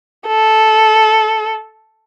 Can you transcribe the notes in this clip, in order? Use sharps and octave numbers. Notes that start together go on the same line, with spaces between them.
A4